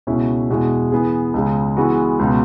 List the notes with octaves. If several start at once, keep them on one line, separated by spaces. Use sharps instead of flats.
C#2 B2 G#3 C#4 E4
E2 B2 G#3 E4
E3 B3 G#4
C#2 C#3 G#3
E3 G#3 B3 F#4
C#2 B2 B3